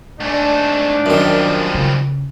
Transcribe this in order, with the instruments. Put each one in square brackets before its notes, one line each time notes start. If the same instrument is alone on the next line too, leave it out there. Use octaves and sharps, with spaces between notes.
[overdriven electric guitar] G#2 A3 [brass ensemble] D4
[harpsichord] F#2 D#3 [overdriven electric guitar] F3 G3
[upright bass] C#3